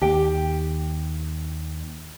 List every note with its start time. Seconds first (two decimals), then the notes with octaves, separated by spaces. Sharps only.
0.01 D#2 G4 G5